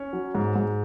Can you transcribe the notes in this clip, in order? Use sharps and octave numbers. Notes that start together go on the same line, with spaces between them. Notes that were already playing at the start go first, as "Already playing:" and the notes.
Already playing: C#4 C#5
F#3
G#2
G#2